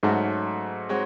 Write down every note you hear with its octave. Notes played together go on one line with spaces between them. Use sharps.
G#2 F#3 A3 C#4 F#4 A4
G#3 C4 F#4 C#5